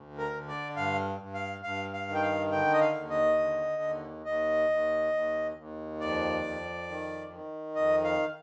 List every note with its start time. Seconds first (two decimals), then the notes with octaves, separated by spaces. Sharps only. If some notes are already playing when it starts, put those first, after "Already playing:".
Already playing: D2
0.18 A#4
0.33 D3
0.48 D5
0.76 G2 F5
1.21 G2
1.34 F5
1.63 G2 F5
1.94 F5
2.08 D#3
2.15 G5
2.22 F5
2.52 D3 G5
2.73 D#5
2.80 F5
2.94 D#2
3.10 D#5
3.39 D3
3.82 D#2
4.25 D#2 D#5
4.70 D#2
5.13 D#2
5.57 D#2
6.01 F2 D5
6.44 F2
6.88 D#3
7.32 D#3
7.75 F2 D#5
8.04 F5